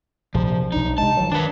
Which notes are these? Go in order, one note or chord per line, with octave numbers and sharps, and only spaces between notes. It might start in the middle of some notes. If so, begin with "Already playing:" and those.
A#1 C3 F3
B1 D4 D#4
C3 G#3 A5
D#3 F3 F#3
D#3 D4 B4